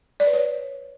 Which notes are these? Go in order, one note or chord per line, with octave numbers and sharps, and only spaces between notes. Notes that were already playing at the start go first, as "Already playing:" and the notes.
D5
B4
C#5